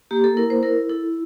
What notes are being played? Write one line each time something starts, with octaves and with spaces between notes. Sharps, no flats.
A#3 G4
A4
E4 A#4
C5
E4 A#4
E4 A4